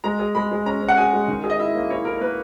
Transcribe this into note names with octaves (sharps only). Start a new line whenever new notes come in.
G#3 A#5
G#4
G#3 B5
G#3
C#4 A#5
C#4
F#5
G#4 G#5
G#3
D#3
G#4
D#5
E4 E5
A#3
E4 C#5
E4 A#4
A#4
A#3 B4